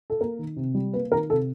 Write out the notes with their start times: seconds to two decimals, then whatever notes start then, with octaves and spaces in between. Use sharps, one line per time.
0.10 A4
0.21 A#3 A#4
0.39 D#3
0.56 C3
0.75 G3
0.93 A#3 B4
1.12 D#3 A#4
1.29 C3 A4